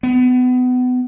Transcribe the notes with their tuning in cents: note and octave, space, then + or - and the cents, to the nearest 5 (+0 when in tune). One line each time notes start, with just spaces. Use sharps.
B3 +30